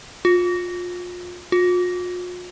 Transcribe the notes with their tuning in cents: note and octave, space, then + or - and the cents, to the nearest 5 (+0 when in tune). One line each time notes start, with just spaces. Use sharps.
F4 +30
F4 +45